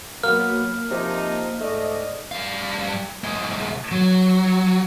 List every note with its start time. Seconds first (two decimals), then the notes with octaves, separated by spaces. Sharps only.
0.23 F#3 A#3 B3 F6
0.91 C3 F3 D#4
1.60 G#2 A3 D5 D#5
2.32 G3 F5
3.24 C2 G#3
3.92 F#3